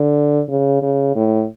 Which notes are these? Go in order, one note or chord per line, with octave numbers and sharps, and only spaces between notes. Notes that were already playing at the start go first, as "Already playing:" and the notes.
Already playing: D3
C#3
C#3
A2